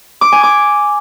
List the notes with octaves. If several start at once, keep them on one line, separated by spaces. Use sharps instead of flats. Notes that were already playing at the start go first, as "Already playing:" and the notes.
D6
G#5
D6